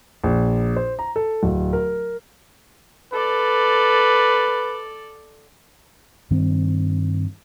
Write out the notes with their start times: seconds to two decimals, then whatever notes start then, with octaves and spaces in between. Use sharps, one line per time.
0.24 A#1
0.76 C5
0.99 A#5
1.16 A4
1.43 D1
1.73 A#4
3.13 A4 B4 D5
6.31 G2 D#3 C4